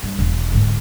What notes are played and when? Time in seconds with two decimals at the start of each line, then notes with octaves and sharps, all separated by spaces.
0.03 G2
0.19 E1
0.52 D2 G#2